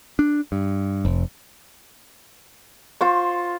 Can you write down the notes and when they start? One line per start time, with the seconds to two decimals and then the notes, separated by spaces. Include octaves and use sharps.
0.19 D4
0.52 G2
1.05 F1
3.01 F4 C5 C#6